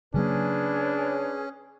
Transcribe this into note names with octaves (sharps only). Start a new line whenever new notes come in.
C#3 F#3 A#3 C#4 D4 G#4 B4 C#5